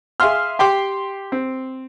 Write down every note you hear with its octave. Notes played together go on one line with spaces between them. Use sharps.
G#4 E5 F5 C6 F6
G4 G5 C6 D6
C4